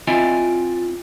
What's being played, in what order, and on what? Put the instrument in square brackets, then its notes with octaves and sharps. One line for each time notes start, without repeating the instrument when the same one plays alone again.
[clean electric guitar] C4 E4 F4 D5 D#5 G#5